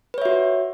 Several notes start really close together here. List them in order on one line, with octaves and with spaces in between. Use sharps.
B4 C#5 E5 F#4